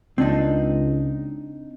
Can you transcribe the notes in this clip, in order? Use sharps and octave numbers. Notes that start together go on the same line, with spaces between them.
C#2 C4 D4 D#4